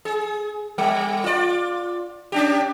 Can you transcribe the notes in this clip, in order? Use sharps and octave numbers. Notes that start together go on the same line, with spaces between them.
G#4
G3
F4 D5
C#4 D4 G4